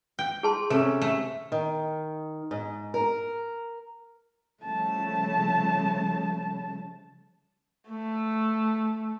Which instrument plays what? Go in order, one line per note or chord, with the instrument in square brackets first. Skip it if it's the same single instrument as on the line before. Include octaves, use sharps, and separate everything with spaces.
[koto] G5
[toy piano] G#4 A5 C6
[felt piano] C3 C#4 [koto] A3 [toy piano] A4
[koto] A3
[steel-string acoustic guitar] D#3
G#2
A#4
[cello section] C#3 F3 G3 [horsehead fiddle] A3 A5
[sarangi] A3